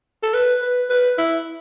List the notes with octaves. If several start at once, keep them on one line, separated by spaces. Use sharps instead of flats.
A4
B4
B4
B4
E4